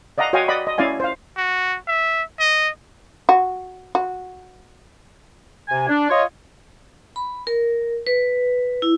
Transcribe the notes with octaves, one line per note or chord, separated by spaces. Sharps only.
D5 D#5 F5 F#5 A#5
F#4 C#5 D#5 F5 G5 G#5
D5 D#5 F#5 B5
D#5
C#4 E4 D5 F5 G#5
C5 F5
F#4
E5
D#5
F#4
F#4
C3 G#5
D4
F4 C#5 D#5
B5
A#4
B4
E4